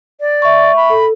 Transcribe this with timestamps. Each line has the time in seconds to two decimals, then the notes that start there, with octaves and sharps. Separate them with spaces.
0.21 D5
0.42 E5 C#6
0.76 B5
0.90 A4